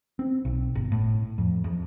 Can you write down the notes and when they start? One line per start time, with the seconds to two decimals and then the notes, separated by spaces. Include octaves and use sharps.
0.19 C4
0.45 B1
0.75 G1
0.92 A2
1.38 F2
1.64 F2